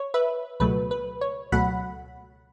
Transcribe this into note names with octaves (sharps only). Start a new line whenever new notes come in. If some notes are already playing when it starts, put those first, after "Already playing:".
Already playing: C#5
B4 E5
C#2 B2 F#3 A3 B4
B4
C#5
C#2 B2 F#3 A3 F#5 B5